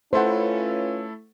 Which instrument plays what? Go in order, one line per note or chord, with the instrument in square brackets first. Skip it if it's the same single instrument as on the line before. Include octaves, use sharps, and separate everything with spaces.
[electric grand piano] A3 E4 A4 [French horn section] C#4 F4 B4 [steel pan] C5 F#5